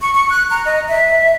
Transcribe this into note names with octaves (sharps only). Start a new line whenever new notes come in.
C#6
C#6
F#6
A#5
D#5
E5